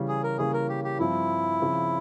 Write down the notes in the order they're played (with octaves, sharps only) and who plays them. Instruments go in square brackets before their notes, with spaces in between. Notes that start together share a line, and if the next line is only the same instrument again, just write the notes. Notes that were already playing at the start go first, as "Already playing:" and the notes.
Already playing: [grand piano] C#3 E3 G3
[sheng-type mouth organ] G#4
A#4
[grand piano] C#3 E3 G3 A#3 [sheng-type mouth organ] G#4
[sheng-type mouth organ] A#4
G4
G4
[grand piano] G2 F3 C4 F4 [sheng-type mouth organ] E4
[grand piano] C#3 F3 C4